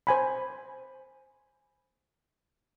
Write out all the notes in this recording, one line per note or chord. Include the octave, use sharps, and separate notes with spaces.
C5 G#5 B5